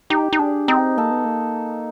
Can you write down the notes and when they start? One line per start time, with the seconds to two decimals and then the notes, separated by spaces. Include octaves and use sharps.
0.10 D#4 G4
0.33 D#4
0.39 D4 G#4
0.68 C4 D#4
0.97 A#3 A4
1.11 B3
1.25 A#3